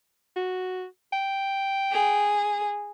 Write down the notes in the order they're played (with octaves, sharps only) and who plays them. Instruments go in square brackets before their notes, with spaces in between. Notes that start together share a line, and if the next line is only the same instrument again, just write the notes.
[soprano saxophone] F#4
G5
[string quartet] G#4